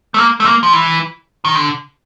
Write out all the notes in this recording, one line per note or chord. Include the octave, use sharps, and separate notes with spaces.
A3
A#3
A3
A#3
F3
E3
D#3
D3